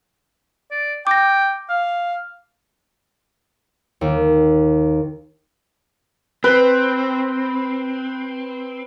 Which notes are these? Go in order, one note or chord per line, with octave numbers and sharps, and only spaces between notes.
D5
G5 D6 A#6
F5
D#2
C4 B4